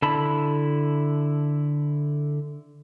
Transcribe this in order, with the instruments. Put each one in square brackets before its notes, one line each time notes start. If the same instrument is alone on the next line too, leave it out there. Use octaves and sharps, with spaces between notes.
[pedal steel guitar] D3 E4 A5 B5